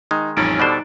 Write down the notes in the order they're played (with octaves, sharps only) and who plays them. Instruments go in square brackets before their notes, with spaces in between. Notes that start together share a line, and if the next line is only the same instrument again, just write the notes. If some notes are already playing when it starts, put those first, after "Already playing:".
[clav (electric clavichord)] D#3 G#3 [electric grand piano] D#4
[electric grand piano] A1 F2 G3 [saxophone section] C#4 [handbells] D#4 A6 D7
[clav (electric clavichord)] B2 G3 C5 [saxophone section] D3 [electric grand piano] F#6